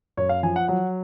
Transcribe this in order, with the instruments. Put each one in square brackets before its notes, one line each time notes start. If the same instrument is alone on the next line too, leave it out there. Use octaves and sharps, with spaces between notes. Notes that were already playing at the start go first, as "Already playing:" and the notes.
[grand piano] F#2 C#5
F5
F3 G#5
F#5
F#3 F#5